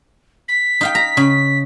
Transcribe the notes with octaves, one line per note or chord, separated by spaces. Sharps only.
B6
D#4 F5 G5
A#5
C#3